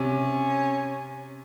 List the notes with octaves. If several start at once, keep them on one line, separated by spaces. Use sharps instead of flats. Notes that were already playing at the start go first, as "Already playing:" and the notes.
Already playing: C3 C#4